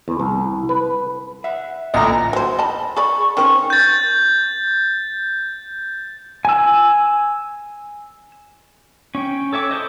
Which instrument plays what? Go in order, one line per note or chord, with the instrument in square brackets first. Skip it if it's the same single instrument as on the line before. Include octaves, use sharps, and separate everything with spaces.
[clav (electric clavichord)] E2
C2
B4
[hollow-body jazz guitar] E5 F#5
[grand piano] A1 D2 A#2 [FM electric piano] D#5 A#5
[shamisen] F#3 C5
D#5 A5 B5
[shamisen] G#4 D5 B5 [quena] C#6
[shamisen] D#3 C4 C#4 [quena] C#6
[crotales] G6 A6
[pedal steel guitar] G#5 E6
C#4 C#5 G5
A4 C#5 E5 D6
E4 A4 C5 D#5